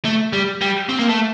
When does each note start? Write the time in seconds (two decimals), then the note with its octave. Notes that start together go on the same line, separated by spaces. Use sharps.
0.05 A3
0.33 G3
0.61 G3
0.89 C4
0.99 A#3
1.09 A3